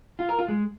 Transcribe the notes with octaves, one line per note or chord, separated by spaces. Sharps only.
F4
A#4
F4
G#3